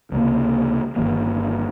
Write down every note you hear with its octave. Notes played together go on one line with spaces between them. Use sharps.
C#2 C3 G3 A#3
G1 F2 D#3 A#3